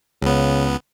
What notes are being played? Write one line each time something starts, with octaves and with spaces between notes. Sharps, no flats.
C#2 C#3 B3